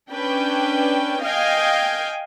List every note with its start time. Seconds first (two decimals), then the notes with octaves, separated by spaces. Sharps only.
0.11 C#4 D4 B4 G5
1.23 D#5 F5 G5 G#5